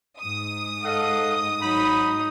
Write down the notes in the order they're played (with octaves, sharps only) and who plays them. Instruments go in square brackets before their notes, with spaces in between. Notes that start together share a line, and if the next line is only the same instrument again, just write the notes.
[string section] G#2 D#6
[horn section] A4 F5 F#5 [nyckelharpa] D#5
[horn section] F#3 B5 [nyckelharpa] D#4